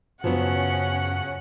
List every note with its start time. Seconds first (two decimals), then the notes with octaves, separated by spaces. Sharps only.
0.24 F#2 C#3 F3 F#3 B3 C#4 F#5